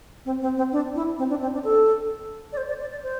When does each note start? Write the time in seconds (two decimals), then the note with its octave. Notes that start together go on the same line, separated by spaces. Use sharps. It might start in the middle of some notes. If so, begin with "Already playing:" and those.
0.25 C4
0.42 C4
0.57 C4
0.72 D4
0.95 E4
1.18 C4
1.30 D4
1.42 C4
1.53 D4
1.64 A4
2.53 D5
2.57 C5
2.69 D5
2.81 D5
2.91 D5
3.03 C5